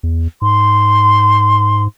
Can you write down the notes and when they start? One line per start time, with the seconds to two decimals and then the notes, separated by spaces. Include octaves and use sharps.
0.03 E2
0.42 G#2 C6